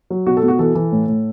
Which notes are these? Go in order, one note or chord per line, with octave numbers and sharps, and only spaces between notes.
F#3
B2 F#4
A4
B2
F#4
E3 A4
E3
A2
A2